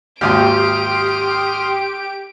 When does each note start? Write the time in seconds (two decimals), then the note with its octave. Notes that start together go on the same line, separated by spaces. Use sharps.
0.21 G#1 D#2 G4 C6 D#6 F6 D7